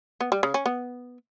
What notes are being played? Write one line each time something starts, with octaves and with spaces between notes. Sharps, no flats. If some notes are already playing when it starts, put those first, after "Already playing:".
B3
G3
C#3
C#4
B3